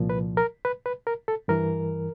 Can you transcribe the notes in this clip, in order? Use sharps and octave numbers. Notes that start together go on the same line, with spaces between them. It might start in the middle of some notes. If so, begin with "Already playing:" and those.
Already playing: C2 A#2 F3
B4
A#4
B4
B4
A#4
A4
G2 E3 A#4